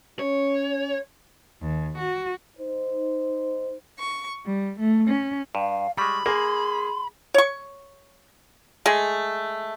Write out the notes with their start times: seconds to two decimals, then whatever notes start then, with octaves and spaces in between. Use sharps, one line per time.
0.19 C#4 C#5
1.61 D#2
1.98 F#4
2.57 D#4 C5
3.98 C#6
4.45 G3
4.79 A3
5.09 C#4
5.55 G2 F5
5.98 G3 G#3 B5 C#6
6.26 A#3 G#4 C6
7.34 C#5 C#6
8.86 G#3 A3 G#4